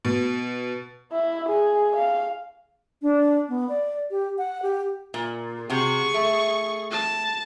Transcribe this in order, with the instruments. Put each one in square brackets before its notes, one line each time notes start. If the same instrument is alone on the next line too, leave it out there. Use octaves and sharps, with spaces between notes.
[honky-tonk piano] B2
[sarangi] E4
G#4
F5
[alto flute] D4
B3
D5
G4
F#5
G4
[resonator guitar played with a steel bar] A#2
[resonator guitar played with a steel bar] C3 F#4 [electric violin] G#4 C#6
[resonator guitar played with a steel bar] A3
[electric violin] A5